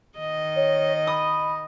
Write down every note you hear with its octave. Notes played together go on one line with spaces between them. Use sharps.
D#3 D#5
C#5
B5 D#6